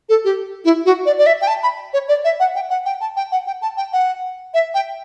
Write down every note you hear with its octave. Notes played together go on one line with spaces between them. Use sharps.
A4
G4
E4
F#4
D5
D5
E5
G5
A5
B5
C#5
D5
E5
F#5
G5
F#5
G5
A5
G5
F#5
G5
A5
G5
F#5
E5
G5